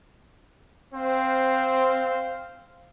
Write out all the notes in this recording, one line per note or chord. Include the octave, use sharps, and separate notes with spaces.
C4 C5 F5